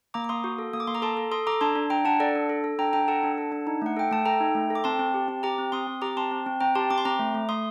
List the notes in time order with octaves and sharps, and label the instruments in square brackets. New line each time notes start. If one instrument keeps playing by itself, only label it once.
[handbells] A#3 A#5 D6
D6
A#3 C6 D#6
F#4
A4
A#3 D#6
D6
A#3 C6
A#5 D6
A4 A5 C6
A4
A4 C6 D#6
A4 A#5 D6
D4 A5 C6
D4
D4 G5 A#5
D4 F#5 A5
A4 D5 F#5
D4
A4
A4
D4 G5 A#5
D4 G5 A#5
A4 F#5 A5
D4
A4
D4
D#4
A3 F#5
A4 G5
A3 A5
A4 G5 A#5
D#4
A3
A4
D6
C4 A5 C6
C4
G4
C4
G4 A#5 D6
C4
C4 C6 D#6
C4
G4 A#5 D6
C4 A5 C6
C4
C4
C4 G5 A#5
G4 A5 C6
C4 D6
C6
C4 A#5 D6
A3
A3
A3 C6 D#6